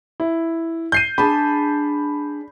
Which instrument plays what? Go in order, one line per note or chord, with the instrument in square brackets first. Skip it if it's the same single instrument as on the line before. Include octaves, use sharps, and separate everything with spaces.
[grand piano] E4
G6 C7 D#7
[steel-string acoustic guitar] D4 G#4 A5 [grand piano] B5